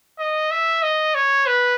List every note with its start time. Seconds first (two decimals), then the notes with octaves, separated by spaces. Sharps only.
0.19 D#5
0.51 E5
0.82 D#5
1.15 C#5
1.46 B4